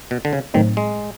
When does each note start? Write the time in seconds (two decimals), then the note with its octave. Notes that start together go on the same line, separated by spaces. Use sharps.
0.11 B2
0.25 D3
0.33 C#3
0.54 A2 D#3 F#3 A3 C4 D#4
0.77 G#3